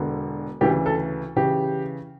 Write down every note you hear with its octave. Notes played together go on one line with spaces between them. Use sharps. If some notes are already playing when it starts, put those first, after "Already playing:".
Already playing: E1 E2 D3
D2 C#3 E3 G4
A4
C#3 E3 G4